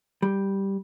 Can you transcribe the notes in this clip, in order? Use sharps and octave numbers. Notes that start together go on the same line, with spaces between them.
G3